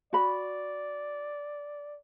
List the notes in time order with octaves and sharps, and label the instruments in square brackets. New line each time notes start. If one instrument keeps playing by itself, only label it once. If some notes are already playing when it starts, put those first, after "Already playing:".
[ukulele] F#4 B5 [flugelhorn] D5